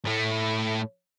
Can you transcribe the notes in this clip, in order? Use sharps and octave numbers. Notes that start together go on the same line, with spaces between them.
A2 A3